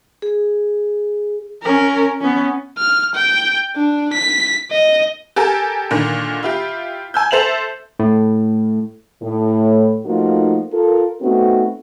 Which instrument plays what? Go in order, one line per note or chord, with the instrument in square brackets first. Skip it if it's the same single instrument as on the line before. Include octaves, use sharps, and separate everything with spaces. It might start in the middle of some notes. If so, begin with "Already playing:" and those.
[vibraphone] G#4
[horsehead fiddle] C#4 A#4
B3 C#4
[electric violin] F6
G5
D4
B6
D#5
[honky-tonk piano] G4 A4 A#4 G#5
A#2 D3 D#3
E4 F4 G4
G#5 E6 G6
A4 C5 E5 F7 F#7
[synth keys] A2
[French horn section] A2
F3 A3 A#3 D#4 F4 F#4
F4 A4 A#4
A3 B3 C4 D#4 F#4